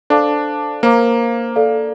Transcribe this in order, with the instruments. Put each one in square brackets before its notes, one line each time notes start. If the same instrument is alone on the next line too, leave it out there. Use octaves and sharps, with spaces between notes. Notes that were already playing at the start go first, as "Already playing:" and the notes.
[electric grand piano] D4 [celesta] A4 C5 F5 A5 D6
[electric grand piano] A#3 [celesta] C5 F5 A#5 D6
[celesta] A4 D5 F5